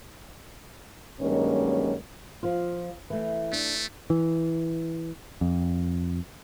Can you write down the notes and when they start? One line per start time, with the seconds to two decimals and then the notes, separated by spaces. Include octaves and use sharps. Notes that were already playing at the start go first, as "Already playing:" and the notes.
1.21 G2 D#3 F#3 G#3 A#3 C#4
2.43 F3 F4
3.10 E3 A3
3.52 A3 D4
4.10 E3
5.41 F2